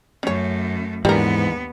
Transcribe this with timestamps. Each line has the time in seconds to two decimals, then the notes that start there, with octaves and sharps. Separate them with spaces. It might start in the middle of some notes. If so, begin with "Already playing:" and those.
0.23 F#2 A3 C#4 C#5
1.05 D#2 G#2 E3 G3 B3 D4 A#4